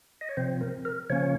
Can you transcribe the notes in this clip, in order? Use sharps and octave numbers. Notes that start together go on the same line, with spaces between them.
D#5
C#5
C3 F3 C4 C5
A#4
A#4
C#3 F3 A#3 C#4 C#5